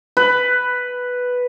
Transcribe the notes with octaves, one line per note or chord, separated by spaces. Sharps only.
B4